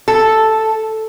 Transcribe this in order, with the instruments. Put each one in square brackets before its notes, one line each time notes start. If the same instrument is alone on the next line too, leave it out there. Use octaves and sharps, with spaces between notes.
[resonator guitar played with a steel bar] A4